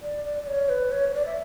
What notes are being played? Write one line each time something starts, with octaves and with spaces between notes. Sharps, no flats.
D5
D5
D5
C#5
B4
C#5
C#5
D5
E5